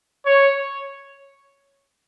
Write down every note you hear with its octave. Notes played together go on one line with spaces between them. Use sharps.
C#5